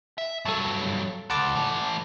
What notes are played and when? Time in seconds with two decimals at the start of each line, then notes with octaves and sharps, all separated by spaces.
0.18 E5
0.45 G2 F#3 A4 A5
1.30 C#2 F#5 A5 D6
1.55 E3 A3